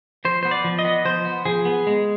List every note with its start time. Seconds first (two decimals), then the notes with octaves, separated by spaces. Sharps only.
0.25 F3 C5
0.43 B3 C5
0.51 D5
0.64 F3
0.79 D#5
0.85 B3
1.05 F3 C5
1.25 B3
1.45 F3 G#4
1.65 B3
1.87 G#3